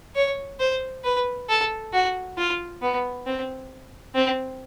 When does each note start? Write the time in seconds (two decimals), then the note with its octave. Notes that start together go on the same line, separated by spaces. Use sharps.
0.15 C#5
0.60 C5
1.04 B4
1.49 A4
1.93 F#4
2.38 F4
2.82 B3
3.27 C4
4.15 C4